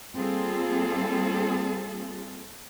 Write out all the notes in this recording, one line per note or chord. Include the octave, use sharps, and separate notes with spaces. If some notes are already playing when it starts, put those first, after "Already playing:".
G3 A#3 C4 F4 G#4 A4